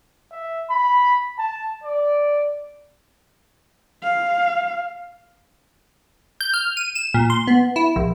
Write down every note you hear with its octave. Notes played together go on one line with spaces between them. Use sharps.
E5
B5
A5
D5
F5
G6
F6
D#7
E7
A#2
C6
B3
E4
A#1